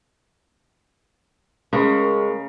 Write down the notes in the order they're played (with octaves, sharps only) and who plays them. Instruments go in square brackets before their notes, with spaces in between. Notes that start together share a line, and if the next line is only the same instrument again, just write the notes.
[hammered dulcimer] C#3 A#5 C#6 [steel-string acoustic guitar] G#3 [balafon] C#4 [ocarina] A#4